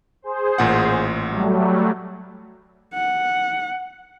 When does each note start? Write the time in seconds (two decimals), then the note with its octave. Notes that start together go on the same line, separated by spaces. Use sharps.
0.22 G#4 C5
0.58 A1 A#2 F#5
1.29 F#3 G3 A3
2.94 F#5